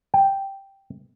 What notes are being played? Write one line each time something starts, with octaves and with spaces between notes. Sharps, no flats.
G5